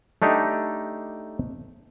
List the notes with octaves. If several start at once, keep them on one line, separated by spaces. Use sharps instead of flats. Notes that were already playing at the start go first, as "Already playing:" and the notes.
A3 D4 D#4 G4